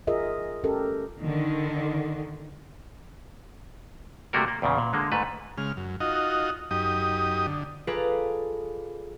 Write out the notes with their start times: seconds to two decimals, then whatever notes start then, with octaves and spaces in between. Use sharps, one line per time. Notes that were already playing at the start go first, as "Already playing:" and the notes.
0.07 F4 G#4 A#4 D#5 E5
0.64 C#4 G4 A4 A#4
1.20 D3 D#3
4.33 C3 G3 A3 A#3 F#4 A#4
4.48 A#3
4.62 E2 A#2 C#3
4.78 A#2
4.93 D3 G#3 A#3
5.12 G#2 A3 B4
5.58 C#3 G#3 F6
5.77 F#2
6.00 D#4 F4 F#4 D#5
6.71 F#2 D#4 G4 D#6
7.47 D3
7.87 F4 G#4 A4 B4 D5 A#5